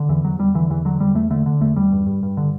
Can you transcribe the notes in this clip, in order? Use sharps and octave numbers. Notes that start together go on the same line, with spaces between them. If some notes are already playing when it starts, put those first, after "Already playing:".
Already playing: D3
E2 E3
E2 F#3
E2 G3
D3 E3
E2 E3
D3 F#3
E2 G3
E2 A3
D3 A3
D3
E2 A3
E2 G3
G2
G2
G2
D3